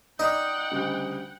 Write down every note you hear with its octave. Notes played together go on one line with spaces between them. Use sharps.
D#4 D5 F#5 G5 B5 F#6
D2 C#3 G3